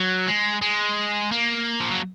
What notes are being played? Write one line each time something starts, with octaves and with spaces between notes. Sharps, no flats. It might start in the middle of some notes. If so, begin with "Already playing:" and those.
Already playing: F#3
G#3
G#3
A#3
F3
F#3